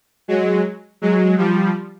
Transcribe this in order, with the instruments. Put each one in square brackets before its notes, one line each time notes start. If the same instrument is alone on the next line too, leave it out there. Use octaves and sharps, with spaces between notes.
[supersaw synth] F#3 G#3
F#3 G#3
F3 G3